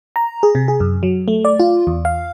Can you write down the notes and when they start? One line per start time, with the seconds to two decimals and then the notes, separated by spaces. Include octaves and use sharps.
0.16 A#5
0.43 G#4
0.55 C3
0.68 G#4
0.80 F#2
1.03 F#3
1.28 A3
1.45 D5
1.60 F4
1.87 E2
2.05 F5